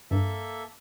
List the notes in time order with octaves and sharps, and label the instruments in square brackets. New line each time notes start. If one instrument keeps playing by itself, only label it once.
[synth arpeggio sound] G2 [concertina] A#3 A4 E5